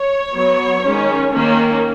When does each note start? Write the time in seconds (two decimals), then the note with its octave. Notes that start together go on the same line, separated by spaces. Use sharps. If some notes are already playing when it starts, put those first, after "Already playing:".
Already playing: C#5
0.34 F#3 B3
0.84 D#3 G#3 C#4
1.33 D#3 A#3 C#4